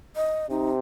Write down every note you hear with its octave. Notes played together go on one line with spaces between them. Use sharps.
D#5
C3 D#4